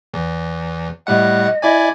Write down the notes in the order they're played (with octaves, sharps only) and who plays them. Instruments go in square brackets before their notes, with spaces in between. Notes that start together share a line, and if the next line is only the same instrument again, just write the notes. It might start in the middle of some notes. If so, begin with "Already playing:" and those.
[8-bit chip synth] E2
[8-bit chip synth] A2 G3 F#5 [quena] D#5
[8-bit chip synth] E4 D5 G#5